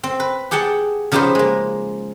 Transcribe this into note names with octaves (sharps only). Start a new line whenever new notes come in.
C4
B4
G4 G#4 F#5 G5 A5
C#3 F3 D#4 G4 B4 C5
G#3 A#3